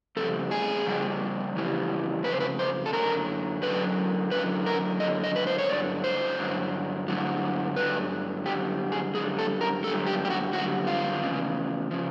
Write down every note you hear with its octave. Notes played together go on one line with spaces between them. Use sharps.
F2 C#3 G3 A4
G#4
F2 C#3 G3
F2 C#3 E3 G3
F2 C#3 B4
C5
B4
C5
A4
F#2 D3 F#3 A#4
F#2 D3 F#3 B4
F#2 D3 F#3 B4
A#4
F#2 D3 F#3 D#5
D#5
B4
C5
C#5
G2 D3 F#3 D5
C5
G2 D3 F#3
G2 D3 F#3
G2 D3 F#3 B4
F#2 D3 G3 G4
G#4
F#2 D3 G3 G#4
A4
A#4
F#2 D3 G3 A4
G4
G4
F#4
F#2 D3 G3 F#4
F4
E2 C#3 F3
C#3 F3